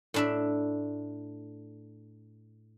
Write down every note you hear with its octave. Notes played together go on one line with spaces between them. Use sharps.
A2 D4 E5